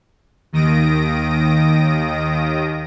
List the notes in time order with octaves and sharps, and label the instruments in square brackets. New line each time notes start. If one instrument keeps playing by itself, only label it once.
[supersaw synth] D#2 D#3 D#6 A#6 D7